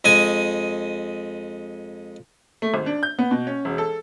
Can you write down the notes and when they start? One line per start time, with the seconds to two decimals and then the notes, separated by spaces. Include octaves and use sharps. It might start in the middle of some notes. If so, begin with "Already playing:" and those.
0.04 F2 G#3 G#5 D#6
2.62 A3
2.74 G#1
2.86 D4
3.03 G6
3.19 B3
3.31 B2
3.47 C#4
3.65 E1
3.78 A4